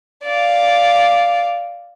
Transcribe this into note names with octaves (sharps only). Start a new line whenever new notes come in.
D5 F5